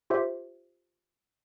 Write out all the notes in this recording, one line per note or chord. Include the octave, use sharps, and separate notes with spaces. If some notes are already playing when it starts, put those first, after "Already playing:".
F4 G4 C5 E5